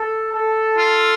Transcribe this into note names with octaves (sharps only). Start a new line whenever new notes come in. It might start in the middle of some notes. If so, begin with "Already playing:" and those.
Already playing: A4
A4
F4